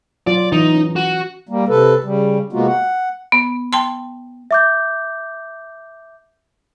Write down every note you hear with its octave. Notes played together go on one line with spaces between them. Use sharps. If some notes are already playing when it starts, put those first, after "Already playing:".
F#3 F4 D5
E3 D#4
C#4
F#4
G3 A#3
C3 A4 B4
C#3 G3
C3 G#3 A#3 B3 F4 F#4
F#5
B3
G5 A5 C6
E5 D6 G6